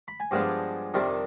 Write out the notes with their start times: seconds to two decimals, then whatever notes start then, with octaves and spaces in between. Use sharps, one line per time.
0.08 B5
0.20 G#5
0.31 G2 F3 G#3 B3 D4 G5
0.94 F2 C3 D#3 G3 D4